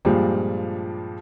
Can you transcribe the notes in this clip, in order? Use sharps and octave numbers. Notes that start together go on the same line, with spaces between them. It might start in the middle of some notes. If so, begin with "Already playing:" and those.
G2 A#2 F3 G3 G#3